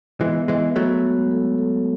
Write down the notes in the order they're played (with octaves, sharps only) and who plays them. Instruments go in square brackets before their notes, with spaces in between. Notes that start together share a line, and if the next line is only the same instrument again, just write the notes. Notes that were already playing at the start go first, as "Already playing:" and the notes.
[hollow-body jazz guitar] E3 G#3 [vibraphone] B3
[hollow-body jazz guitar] E3 G#3 [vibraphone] B3
[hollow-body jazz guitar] F#3 A3 [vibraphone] B3
[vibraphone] G#3
A4
A4